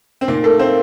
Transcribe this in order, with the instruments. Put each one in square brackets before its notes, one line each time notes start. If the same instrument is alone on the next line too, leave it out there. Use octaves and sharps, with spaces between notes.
[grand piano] C4
[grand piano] A#2 A#3 [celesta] D#4
[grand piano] A3 A4 [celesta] A#4
[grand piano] C4 C5 [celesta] F5